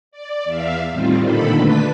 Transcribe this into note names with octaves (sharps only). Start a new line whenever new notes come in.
D5
E2 E5 F5
A2 D#3 G3 C4 F4
A#2 D3 D#3 A4 B5
D3 A3 D4 B4 B6